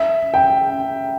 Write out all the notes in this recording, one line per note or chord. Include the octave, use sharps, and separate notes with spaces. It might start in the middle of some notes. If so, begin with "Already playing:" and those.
Already playing: E5
G5